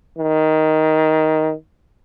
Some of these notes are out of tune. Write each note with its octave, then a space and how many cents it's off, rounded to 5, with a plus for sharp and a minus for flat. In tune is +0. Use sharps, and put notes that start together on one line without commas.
D#3 +10